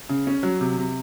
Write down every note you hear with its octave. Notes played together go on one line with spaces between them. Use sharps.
C#3
C#4
F#3
C3
C3